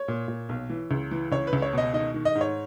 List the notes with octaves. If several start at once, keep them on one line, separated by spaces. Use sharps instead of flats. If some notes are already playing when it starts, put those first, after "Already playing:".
Already playing: C#5
A#2
A#2
B1
E3
C#2
E3
C#2 C#5
B4
C#2
C#5
B2 D#5
D#3 D#5
D#3
D#5
G#2
C#5